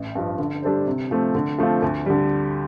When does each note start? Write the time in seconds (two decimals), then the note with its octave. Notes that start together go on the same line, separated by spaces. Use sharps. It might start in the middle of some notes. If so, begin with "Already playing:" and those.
Already playing: A1
0.15 G2 F3
0.39 D3
0.63 G3 D4 A4 C5
0.87 C3
1.11 F3 A3 C4
1.35 D3
1.58 F3 A3 C4 F4
1.82 D2
2.06 D3 G3